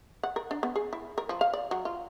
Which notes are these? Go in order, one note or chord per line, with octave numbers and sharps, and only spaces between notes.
F#5
A#4
D4
B3
G#4
E4
A#4
F3
F5
D5
F#3
F4